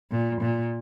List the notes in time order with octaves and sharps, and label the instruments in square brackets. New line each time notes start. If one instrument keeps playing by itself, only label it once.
[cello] A#2
A#2